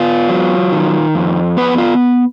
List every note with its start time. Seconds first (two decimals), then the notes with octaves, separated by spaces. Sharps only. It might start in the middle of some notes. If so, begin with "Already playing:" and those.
Already playing: B3 F4
0.29 F#3
0.72 D#3
1.15 F2
1.57 B3 B4
1.78 F4